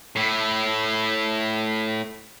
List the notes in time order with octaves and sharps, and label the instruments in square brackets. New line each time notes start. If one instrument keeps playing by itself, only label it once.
[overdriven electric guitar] A2 E4